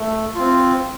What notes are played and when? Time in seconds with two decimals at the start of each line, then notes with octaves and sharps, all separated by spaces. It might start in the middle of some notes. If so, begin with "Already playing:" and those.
Already playing: A3
0.35 C4 F4